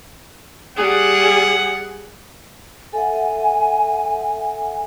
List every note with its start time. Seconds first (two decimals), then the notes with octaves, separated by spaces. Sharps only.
0.77 G3 G#4 F#5
2.93 A4 E5 F#5 G#5